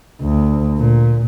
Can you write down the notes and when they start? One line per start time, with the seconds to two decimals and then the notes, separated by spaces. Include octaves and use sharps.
0.22 D2
0.78 A#2